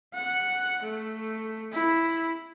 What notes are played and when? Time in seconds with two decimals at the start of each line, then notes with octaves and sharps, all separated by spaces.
0.14 F#5
0.82 A3
1.72 E4